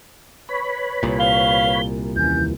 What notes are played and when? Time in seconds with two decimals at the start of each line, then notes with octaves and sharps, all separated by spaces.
0.49 B4 C#5 B5
1.03 C2 A#2
1.19 F5 G7
2.16 D#2 E3 C#4 G6